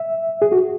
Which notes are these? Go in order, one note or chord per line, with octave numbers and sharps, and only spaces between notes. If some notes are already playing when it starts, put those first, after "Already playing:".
Already playing: E5
G#4
F#4